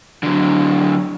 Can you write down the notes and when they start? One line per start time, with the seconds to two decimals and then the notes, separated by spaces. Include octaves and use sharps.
0.23 D3 F#3